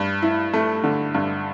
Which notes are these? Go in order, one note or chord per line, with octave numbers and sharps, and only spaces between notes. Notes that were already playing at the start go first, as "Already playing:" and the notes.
Already playing: G2
E4
A3
D3
G2